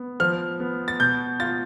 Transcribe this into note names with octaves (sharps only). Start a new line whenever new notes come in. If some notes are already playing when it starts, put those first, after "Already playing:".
Already playing: B3
F3 F6
B3
A6
B2 G6
F4 A6